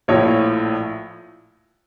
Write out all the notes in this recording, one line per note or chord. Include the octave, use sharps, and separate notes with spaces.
A#1 A2 F3 C#5